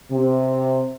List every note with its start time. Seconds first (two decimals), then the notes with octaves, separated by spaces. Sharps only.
0.11 C3